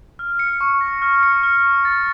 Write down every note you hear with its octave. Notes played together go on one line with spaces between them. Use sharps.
F6
C#7
C#6
A#6
F6
C#7
F6
C#6
A6